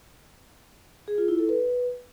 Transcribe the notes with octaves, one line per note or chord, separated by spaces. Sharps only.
G#4
F4
E4
A4
B4